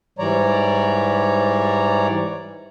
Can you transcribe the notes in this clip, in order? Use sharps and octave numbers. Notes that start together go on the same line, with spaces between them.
G#2 E3 G3 C#5 D5 A#5